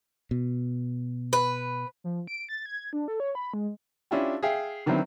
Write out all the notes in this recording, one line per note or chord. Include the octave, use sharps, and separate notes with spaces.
B2
B4
F3
D7
A6
G#6
D4
A4
C#5
B5
G#3
C#4 D4 E4 F4 G4
G#4 E5 F5 G5
D3 D#3 F#3 B3 C4 E4